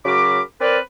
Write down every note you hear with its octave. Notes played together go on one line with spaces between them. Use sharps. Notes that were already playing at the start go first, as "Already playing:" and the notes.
C#3 F#3 F#4 A#4 B5 D6
C4 A#4 B4 D5